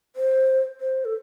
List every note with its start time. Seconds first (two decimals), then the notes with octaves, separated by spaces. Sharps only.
0.16 C5
0.81 C5
1.05 A4